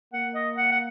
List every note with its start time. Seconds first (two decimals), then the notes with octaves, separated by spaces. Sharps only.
0.13 A#3 F#5
0.35 D#5
0.57 F#5
0.72 F#5